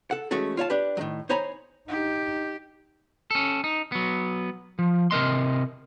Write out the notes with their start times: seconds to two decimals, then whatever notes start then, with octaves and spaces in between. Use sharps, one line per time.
0.11 A4 F#5
0.31 E3 G#3 A3 C#4 F#4 A4
0.57 F4 C#5 F5 A5
0.70 D4 G4 B4
0.97 A2 D#3 F#3
1.29 D#4 C5 C#5 G#5 A#5 B5
1.88 D#4 G4
3.31 C#4 A4
3.64 D#4
3.92 F#3 B3
4.79 F3
5.11 C3 A#4 D#5 C6